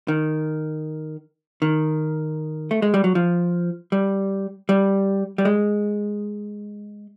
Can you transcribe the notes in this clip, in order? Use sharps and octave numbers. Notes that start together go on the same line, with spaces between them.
D#3
D#3
A3
G#3
G3
F#3
F3
G3
G3
G3
G#3